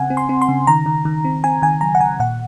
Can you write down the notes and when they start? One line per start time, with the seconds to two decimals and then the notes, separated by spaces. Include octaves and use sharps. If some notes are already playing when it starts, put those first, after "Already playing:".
Already playing: C#3 C4 F#5 G#5
0.10 C4
0.17 C6
0.29 C4
0.42 C6
0.49 C#3
0.67 D#3 A#5
0.86 D#3
1.05 D#3
1.24 C4
1.44 C4 G#5
1.62 D#3 G#5
1.81 F#3 A#5
1.95 F#5
2.00 D#3 G#5
2.19 A#2 F#5